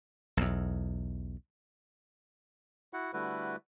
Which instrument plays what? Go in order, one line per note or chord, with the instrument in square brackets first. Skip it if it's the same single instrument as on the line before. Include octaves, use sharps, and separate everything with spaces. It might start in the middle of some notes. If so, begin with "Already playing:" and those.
[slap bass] B1 E2
[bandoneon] E4 F#4 F#5
D3 G3 A3 E4 F#4 B4